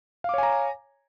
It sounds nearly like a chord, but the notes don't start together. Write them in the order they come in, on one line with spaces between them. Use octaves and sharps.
F5 D6 C#5 G#5 A#5